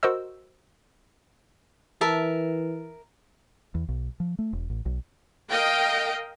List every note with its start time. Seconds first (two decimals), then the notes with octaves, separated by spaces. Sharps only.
0.03 F#4 A#4 C5 D#5 E6
2.01 E3 A#4 E5 A5
3.75 E2
3.89 B1
4.20 F3
4.39 A3
4.53 E1
4.70 A1
4.86 B1
5.52 A#4 D#5 F5 G5